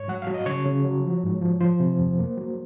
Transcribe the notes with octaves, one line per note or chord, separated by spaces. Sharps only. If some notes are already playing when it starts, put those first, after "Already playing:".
Already playing: G#2 C#5
F#3 F#5
F5
F#3
D#5
C#3 C#5
C#3
F#3
F3
G#2
F3
F3 C5
C3
F2
A#3
F#3